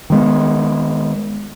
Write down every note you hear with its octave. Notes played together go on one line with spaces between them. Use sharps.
D#3 G#3 B3